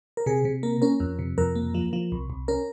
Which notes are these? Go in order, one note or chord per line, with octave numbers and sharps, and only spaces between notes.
A#4
C3 G#4
C3
A#3 A#4
C#4 A#4
F2
C3
F2 A#4
A#3
F3
F3
C2
C2
C#4 A#4